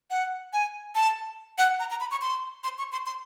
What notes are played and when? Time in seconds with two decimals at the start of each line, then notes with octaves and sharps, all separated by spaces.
0.10 F#5
0.53 G#5
0.95 A5
1.58 F#5
1.80 A#5
1.90 A#5
2.00 B5
2.11 C#6
2.21 C6
2.64 C6
2.78 C#6
2.92 C6
3.06 C6